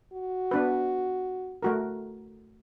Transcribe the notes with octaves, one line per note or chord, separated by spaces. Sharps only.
F#4
B3 D4 B4
A3 F#4 A#4